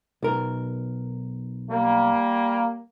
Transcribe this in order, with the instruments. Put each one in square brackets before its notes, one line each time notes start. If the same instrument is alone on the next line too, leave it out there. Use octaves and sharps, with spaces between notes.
[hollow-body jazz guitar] B1 A#4
[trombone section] G3 A#3